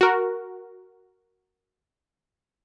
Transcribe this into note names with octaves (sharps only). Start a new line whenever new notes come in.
F#4 A#4